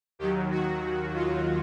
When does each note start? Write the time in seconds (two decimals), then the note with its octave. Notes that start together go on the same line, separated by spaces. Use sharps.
0.19 D#2 D#3 F#3 G4
0.51 F#4
1.15 F4